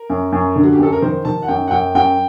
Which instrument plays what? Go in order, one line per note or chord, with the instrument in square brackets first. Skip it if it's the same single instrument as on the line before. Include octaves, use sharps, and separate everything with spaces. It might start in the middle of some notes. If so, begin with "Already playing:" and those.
Already playing: [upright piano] A#4
[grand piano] F#2
F#2
D3
[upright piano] F#4
G4
[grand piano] F#2 [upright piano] A4
[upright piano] A#4
[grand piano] D#3 [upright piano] C5
[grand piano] D#3 [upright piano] A5
[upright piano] F#5
[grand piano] F#2 [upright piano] G5
[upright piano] F#5
[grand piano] F#2 [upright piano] G5
[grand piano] F#2 [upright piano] G5